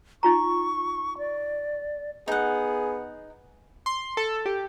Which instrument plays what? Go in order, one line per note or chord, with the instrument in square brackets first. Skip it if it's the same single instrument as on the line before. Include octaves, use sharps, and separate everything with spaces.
[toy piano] D#4 F4 A#5 [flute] C#6
[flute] D5
[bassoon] B3 [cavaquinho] D#4 F#5 [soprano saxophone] G#4
[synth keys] C6
A4
G4